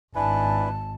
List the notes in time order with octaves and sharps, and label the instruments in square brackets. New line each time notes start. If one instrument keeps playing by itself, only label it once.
[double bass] G#1 [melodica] D4 E4 B4 [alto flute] G#5 [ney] A5